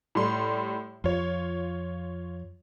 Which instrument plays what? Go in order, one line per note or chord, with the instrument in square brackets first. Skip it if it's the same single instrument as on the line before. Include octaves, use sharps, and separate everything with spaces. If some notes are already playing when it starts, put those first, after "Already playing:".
[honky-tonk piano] A2 G3 C6
[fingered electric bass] F2 [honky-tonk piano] F4 C#5